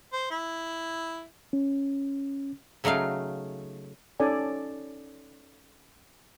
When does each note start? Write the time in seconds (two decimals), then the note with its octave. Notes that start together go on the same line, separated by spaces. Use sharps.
0.13 C5
0.31 E4
1.53 C#4
2.84 C#3 F#3 A3 D#4 F5
4.20 C#4 D#4 A4 D5 G#5